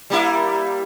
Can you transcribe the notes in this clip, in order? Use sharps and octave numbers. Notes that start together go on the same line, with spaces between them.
G3 A#3 E4